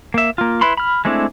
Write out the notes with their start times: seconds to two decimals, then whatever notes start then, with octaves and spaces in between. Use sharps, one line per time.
0.14 A#3 E5
0.38 A#3 F4
0.61 E4 B4 B5 C6
0.77 B5 F6
1.05 G#3 A3 C4 D4 E4